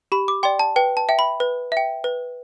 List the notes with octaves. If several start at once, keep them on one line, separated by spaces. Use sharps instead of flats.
G4 B5
D6
D5 G5 C6
A5
B4 G5
A5
E5 G5
B5
B4
E5 G5
B4